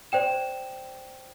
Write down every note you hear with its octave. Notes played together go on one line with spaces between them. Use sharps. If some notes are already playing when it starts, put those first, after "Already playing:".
C5 D5 G5 E7